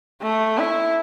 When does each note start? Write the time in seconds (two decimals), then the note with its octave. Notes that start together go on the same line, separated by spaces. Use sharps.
0.22 A3
0.59 E4